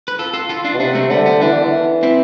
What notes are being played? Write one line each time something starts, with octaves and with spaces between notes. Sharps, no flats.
B4
F4 A4
F4 A4
F4 A4
D4 F4
B2
C3 B3 D4
A3 C4
D3 G3 B3
G3 B3
E3 B3 D4
D3
E3
C4 E4